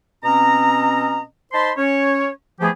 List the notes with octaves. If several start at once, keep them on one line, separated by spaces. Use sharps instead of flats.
B2 C4 C#4 D#5 A#5
D#4 C5 A5 B5 C6
C#4 C#5
E3 F3 A3 B3 G4 G#4